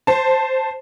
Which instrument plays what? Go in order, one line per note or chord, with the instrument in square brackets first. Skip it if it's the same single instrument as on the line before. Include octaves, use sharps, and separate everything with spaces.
[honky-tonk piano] C5 A5